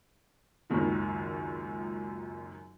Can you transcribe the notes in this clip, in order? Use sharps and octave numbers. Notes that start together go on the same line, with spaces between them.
G#1 C#2 F#2 A#2 D#3